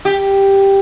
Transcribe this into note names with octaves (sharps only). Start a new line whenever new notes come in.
G4